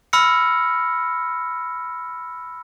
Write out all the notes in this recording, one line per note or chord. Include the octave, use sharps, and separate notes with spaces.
B5 E6 F6 A#6 C#7